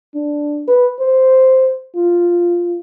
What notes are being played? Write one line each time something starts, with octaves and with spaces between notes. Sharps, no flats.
D4
B4
C5
F4